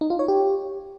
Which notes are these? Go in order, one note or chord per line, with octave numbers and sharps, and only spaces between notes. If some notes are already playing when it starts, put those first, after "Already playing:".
D#4
F4
C#5
G4